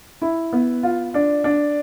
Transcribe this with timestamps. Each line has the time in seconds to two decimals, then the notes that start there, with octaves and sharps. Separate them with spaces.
0.22 E4
0.53 B3
0.83 F4
1.14 D4
1.44 D4